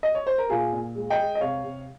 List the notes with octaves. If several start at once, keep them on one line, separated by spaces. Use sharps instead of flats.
D#5
C#5
C5
A#4
A#2 F4 G#4
A#2
G#3
D#5 G5
G#3
D#5
C3 C#5 F5
C3